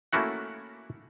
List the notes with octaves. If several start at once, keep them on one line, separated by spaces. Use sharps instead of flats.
A3 A#3 C#4 E4 F#4 F#5